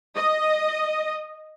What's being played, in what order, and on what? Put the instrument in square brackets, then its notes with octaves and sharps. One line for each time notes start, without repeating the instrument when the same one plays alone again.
[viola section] D#5